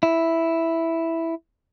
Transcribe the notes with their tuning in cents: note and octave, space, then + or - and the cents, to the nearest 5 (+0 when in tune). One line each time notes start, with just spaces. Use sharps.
E4 +0